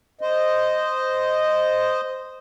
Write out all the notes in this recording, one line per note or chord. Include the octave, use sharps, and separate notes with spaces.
C5 D#5